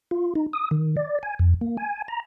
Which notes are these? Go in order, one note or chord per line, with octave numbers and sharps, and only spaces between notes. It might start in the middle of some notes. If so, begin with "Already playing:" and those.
F4
D#4
D#6
D#3
D5
G#5
F2
A#3
G#5
A#5